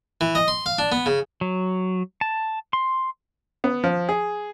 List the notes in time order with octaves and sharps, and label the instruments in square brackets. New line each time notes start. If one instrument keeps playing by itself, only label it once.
[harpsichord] E3
D#5
C6
F5
D4
B3
C#3
[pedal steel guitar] F#3
A5
C6
[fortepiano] B3
F3
G#4